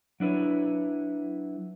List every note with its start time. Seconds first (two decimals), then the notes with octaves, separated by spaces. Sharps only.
0.20 F#3 D4 E4 B4 C#5